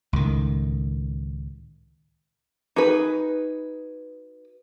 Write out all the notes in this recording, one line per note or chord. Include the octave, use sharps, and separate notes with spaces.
C#2 A2 D#3
D#4 F#4 G#4 B4